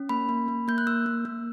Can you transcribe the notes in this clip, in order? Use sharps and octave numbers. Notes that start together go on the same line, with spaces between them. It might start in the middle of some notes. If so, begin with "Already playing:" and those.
Already playing: C#4
A#3 B5
A#3
A#3
A#3 G6
F#6
A#3 E6
A#3
A#3